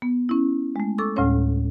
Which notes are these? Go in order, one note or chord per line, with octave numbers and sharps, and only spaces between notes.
B3
C#4 E4
G#3 A3
A4 C#6 D6 E6
D2 A2 G3 C#4 C#5